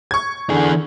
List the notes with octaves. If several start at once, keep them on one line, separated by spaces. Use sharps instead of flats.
C#6 G#6
D3 E3 G#4